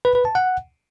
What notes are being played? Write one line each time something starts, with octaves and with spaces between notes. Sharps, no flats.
B4
B4
A5
F#5